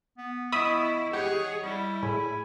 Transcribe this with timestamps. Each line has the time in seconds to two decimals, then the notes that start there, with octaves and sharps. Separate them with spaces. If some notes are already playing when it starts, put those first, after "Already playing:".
0.18 B3
0.52 B3 E4 D#5 E5 B5 C#6 D#6
1.13 G4 G#4 C#5 F#5
1.64 G3 E4
2.03 A2 G#4 G#5 B5